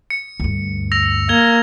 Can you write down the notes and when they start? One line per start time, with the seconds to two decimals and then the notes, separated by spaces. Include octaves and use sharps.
0.10 C#7
0.40 D2 G2
0.92 E6 A#6 F7
1.29 A#3 G#6 F7 G7